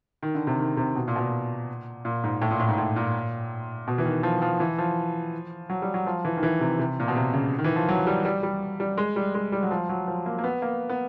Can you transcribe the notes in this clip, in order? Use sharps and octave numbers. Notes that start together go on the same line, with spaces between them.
D#3
D3
C3
D#3
C3
B2
A#2
B2
A#2
A#2
G#2
A2
A#2
A2
G#2
A2
A#2
B2
E3
D#3
F3
F3
E3
F3
F#3
G3
F#3
F3
E3
D#3
E3
C3
C3
A#2
B2
C3
C#3
D#3
E3
F3
F#3
G3
G3
G3
G3
G#3
G3
G#3
G3
F#3
F3
F#3
F3
A#3
A#3
B3
A#3
B3